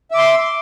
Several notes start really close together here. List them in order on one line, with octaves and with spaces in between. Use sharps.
E5 D6 C6